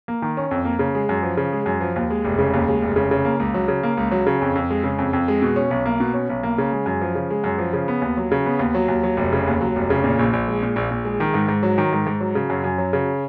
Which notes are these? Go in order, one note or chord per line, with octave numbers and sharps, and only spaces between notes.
A#3
D#3
C#4
F2
A#3
C#3
G#3
F#2
F3
C#3
G#3
F#2
F3
D#2
G#3
F1
C#3
D#2
G#3
F1
C#3
C#3
A#3
C#2
F#3
C#3
A#3
C#2
F#3
C#3
F2
F2
G#3
C#3
F2
F2
G#3
B2
C#4
B1
A#3
B2
C#4
B1
A#3
C#3
G#3
F#2
F3
C#3
G#3
F#2
F3
C#3
B3
D#2
F#3
C#3
B3
D#2
F#3
D#2
F#3
F1
C#3
D#2
F#3
F1
C#3
A#2
A#1
A#1
G#3
A#2
A#1
A#1
G#3
D#3
G#2
G#2
F#3
D#3
G#2
G#2
F#3
C#3
F#2
F#2
F#3
C#3